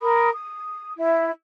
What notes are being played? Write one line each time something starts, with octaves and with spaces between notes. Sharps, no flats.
A#4 B5 D#6
D#6
E4 E5